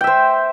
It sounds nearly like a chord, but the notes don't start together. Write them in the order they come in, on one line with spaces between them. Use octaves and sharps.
G5 E5 C5